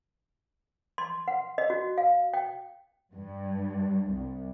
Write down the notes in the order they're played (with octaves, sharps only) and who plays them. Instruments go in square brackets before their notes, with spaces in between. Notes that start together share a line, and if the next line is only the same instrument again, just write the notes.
[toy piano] C6
F#5
D#5
F#4
F5
G5
[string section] G2
C2